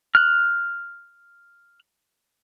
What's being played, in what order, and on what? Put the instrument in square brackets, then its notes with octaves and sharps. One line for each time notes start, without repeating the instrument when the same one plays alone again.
[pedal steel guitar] F6 F#6